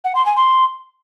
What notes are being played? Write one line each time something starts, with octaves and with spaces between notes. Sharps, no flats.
F#5
C6
G#5
C6